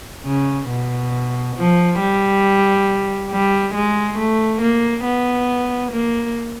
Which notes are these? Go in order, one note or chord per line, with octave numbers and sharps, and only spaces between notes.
C#3
B2
F3
G3
G3
G#3
A3
A#3
B3
A#3